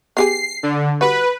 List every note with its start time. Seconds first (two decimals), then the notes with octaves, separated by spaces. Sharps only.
0.17 B3 G4 G#4 C7
0.63 D3
1.01 G3 F#4 B4